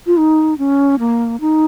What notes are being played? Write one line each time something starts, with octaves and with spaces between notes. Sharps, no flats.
F4
D#4
C#4
A#3
D#4